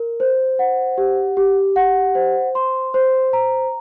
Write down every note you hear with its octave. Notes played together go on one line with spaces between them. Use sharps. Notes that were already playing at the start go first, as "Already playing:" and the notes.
Already playing: A#4
C5
F#5
G4
G4
F#5
C5
C6
C5
A#5